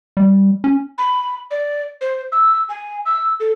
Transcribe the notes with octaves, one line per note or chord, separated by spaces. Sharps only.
G3
C#4
B5
D5
C5
E6
G#5
E6
A4